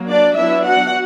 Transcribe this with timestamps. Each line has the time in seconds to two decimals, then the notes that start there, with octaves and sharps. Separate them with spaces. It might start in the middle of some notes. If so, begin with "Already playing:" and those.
Already playing: F#3 A#3
0.09 D4 D5
0.37 F#3 B3 D4 E4 E5
0.65 F#4 F#5